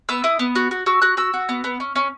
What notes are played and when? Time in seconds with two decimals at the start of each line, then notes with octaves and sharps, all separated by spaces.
0.09 B3 E6
0.24 E4 D#6
0.39 B3
0.55 F#4
0.71 F#4
0.86 F#4 E6
1.02 F#4 F#6
1.17 F#4 E6
1.34 F#4
1.49 B3
1.64 B3
1.80 C#4
1.96 C#4